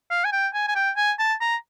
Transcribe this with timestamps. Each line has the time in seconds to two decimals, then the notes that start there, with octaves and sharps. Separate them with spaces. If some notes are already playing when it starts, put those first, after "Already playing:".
0.11 F5
0.25 G#5
0.33 G5
0.54 G#5
0.68 G#5
0.76 G5
0.97 G#5
1.19 A5
1.41 A#5